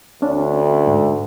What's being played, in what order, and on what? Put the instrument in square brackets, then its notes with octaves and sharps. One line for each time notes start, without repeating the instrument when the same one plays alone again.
[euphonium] D2 [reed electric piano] C#4 D4
[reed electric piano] G#2